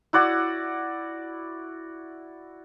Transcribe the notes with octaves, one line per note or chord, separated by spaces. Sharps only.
E4 F#4 D5 F#5